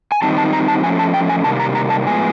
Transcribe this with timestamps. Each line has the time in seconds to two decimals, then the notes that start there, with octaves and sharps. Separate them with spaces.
0.12 G#5
0.22 D#3 G3 C4 D#4 A5
0.38 A5
0.53 A#5
0.68 A5
0.83 F3 A3 C#4 G#5
0.99 A5
1.14 G5
1.29 G#5
1.44 C3 D#3 G3 A#3 A5
1.60 A#5
1.75 A#5
1.90 A5
2.06 A2 F3 G#3 B3 G#5